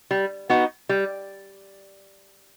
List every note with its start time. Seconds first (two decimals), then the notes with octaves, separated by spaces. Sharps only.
0.11 G3
0.50 B3 D#4 F#4
0.89 G3